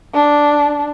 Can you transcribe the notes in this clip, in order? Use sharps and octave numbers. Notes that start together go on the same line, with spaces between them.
D4